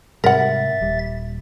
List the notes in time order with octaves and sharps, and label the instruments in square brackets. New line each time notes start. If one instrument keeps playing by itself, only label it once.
[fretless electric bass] G#2 C3 G3 [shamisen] A#4 F#5 [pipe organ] E5 A6
[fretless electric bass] D#1 G3